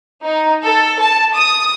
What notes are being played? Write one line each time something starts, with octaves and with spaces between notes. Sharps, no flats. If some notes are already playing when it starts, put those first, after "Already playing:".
D#4
A4
A5
D#6